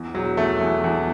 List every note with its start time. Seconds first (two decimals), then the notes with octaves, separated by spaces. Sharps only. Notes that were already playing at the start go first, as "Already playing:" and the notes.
Already playing: E2
0.14 E1 F#3
0.37 E2 A3
0.61 E2
0.84 E2